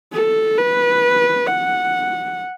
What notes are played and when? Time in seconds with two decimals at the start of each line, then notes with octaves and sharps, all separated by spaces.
0.13 A4
0.58 B4
1.46 F#5